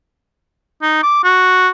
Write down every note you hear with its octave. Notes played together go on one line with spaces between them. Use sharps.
D#4
D6
F#4